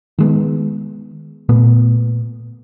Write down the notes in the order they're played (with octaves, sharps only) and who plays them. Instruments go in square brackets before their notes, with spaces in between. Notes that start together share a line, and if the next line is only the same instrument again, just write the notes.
[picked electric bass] D#3 G#3 B3
A#2 A3 B3